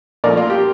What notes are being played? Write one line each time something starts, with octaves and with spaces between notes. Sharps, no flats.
A#2 F3 A3 A#4 D5
F4
G4